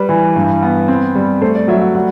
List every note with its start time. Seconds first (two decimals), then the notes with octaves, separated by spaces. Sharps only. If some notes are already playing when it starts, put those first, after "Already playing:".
Already playing: G3 B4
0.09 E3
0.36 G2
0.63 B3
0.88 C4
1.15 G3
1.42 A3 C5
1.55 D5
1.68 F#3 E5
1.81 F#5
1.95 G3 F#5